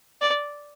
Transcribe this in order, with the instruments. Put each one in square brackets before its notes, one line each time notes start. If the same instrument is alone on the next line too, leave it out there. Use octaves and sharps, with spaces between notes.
[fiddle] D5